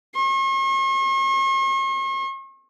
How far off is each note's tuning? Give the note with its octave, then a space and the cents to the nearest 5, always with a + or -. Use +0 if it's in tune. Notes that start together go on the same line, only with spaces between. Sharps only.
C#6 -45